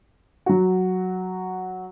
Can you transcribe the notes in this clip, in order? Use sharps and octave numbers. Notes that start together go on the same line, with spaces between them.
F#3 F#4